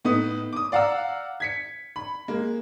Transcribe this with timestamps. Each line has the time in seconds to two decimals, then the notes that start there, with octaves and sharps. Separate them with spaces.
0.05 A2 B3 D#4 D#6
0.53 D6 D#6
0.72 D5 F5 F#5 A#5 E6
1.40 G#6 B6 C#7
1.96 B5
2.28 G#3 A#3